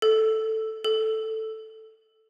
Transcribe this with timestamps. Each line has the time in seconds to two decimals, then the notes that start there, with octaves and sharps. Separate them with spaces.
0.02 A4
0.84 A4